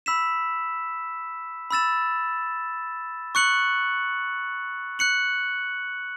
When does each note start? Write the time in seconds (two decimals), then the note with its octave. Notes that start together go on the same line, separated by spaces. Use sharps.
0.06 B5 E6 B6 E7
1.71 B5 E6 A6 E7
3.35 C#6 F#6 C#7 F#7
4.99 F#6 C#7 F#7